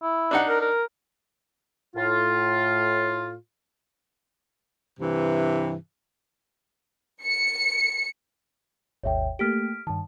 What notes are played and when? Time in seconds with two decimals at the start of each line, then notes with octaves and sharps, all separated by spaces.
0.02 E4
0.31 D4 D#4 F#5
0.49 A#4
0.61 A#4
1.96 A2 F4
5.00 G2 C3 E3
7.23 C#7
9.03 G#1 D#2 C#5 E5 G5
9.39 A3 A#3 G4 F6 B6 D7
9.87 G2 D#3 A5